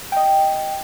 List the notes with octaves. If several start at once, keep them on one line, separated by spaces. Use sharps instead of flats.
D#5 G5